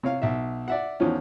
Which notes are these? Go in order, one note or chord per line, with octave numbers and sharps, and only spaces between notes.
C3 C#5 F5
B1 E5
D5 E5 F#5
E2 D#3 F3 C#4